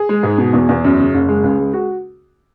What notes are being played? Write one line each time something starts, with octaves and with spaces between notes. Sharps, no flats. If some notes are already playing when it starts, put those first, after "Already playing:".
Already playing: G#4
G#3
G#2
B2
E2
E2
F#2
C#3
F#1
G#3
C#2
G#3
F#4